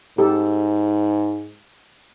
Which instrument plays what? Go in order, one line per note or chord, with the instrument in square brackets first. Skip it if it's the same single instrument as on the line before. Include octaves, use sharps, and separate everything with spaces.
[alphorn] G#2 [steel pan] G4 A4